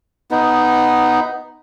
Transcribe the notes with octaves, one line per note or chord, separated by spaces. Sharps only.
B3 D#4